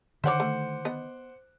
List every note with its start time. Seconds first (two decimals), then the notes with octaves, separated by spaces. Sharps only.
0.24 D3 D#3 C5 C#5 E5 F#5 D6
0.40 A3
0.85 B3 D#5